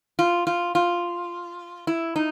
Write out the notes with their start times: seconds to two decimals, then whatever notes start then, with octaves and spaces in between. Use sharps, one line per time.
0.19 F4
0.47 F4
0.75 F4
1.87 E4
2.16 D#4